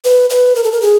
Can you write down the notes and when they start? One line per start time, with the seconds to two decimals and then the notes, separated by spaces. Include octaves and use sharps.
0.05 B4
0.30 B4
0.56 A#4
0.64 A4
0.72 A#4
0.82 G#4